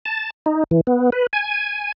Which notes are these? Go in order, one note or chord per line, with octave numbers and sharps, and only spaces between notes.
A5
D#4
E3
B3
B4
G#5